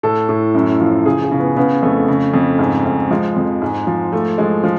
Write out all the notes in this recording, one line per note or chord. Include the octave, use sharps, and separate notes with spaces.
A2 A4
A2
F#2
F3
C#3 G#4
G#4
C#3
B3
C#3 B3
F2 A3
C#3
F2
G#2
G#2
F3 G#3
F2
G#2
F3
F3 A3
F3 G#3
F3